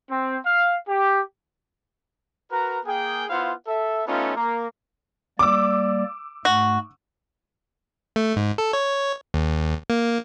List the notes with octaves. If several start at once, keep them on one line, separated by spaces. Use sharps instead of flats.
C4
F5
G4
F#4 A#4 B4 A#5
A#3 G#4 G5
B3 E4 F4 C5 F5 F#5
A4 E5
A3 B3 C#4 D#4 F4
A#3 A#5
G3 A#3 D5 D6 E6
G#2 A3 F#4
A3
G#2
A4
C#5
D#2
A#3